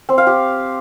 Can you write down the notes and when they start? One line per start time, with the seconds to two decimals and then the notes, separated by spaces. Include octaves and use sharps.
0.09 C4
0.18 F5
0.27 G4